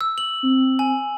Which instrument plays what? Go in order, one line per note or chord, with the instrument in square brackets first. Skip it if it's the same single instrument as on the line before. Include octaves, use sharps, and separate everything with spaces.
[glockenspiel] E6
F#7
[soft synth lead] C4
[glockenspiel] G#5